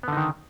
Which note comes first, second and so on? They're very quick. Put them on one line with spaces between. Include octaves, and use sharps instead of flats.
B3 D3 D#4 D#3